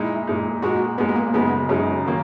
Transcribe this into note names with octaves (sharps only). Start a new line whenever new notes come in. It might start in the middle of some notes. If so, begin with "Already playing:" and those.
Already playing: A#2 G#3 D#4 E4
A#2 G#3 D#4
A#2 G#3 D#4 F#4
A#2 G#3 B3 D#4
B3
A#3
F#2 C#3 G#3 B3 D#4
F#2 C#3 G#3 C#4 D#4
D#3 F#3 A#3